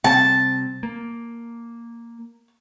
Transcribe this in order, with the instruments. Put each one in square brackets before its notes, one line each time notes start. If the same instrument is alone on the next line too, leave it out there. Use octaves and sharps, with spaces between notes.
[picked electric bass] C3 G3 C4 [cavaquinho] A5
[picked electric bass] A#3